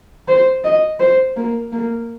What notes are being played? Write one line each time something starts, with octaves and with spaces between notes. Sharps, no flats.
C5
D#5
C5
A#3
A#3